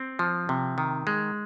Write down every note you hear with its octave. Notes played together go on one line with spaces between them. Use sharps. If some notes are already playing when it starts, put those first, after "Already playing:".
Already playing: C4
F3
C3
D#3
G#3